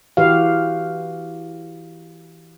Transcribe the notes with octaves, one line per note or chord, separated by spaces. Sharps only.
E3 F#4 G4 B4 F5